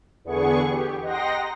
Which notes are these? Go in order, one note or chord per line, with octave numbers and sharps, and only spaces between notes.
E2 D3 B3 G#4 C#6
G4
D#5 F#5 G5 A#5 C6 A#6